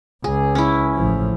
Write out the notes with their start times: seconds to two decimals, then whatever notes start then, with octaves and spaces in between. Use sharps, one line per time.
0.24 C#2 G#4
0.55 C#4 E4
0.94 A1 F3